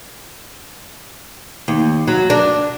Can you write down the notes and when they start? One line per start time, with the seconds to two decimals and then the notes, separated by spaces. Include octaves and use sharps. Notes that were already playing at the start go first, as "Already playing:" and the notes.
1.68 D#2
2.08 F#3
2.30 D4